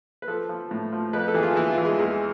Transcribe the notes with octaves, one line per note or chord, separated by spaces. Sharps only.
B4
F3 A4
F3
A2
F3
F2 B4
A4
E3 G#4
F4
E3 E4
F4
E3
G#3
E2 G#3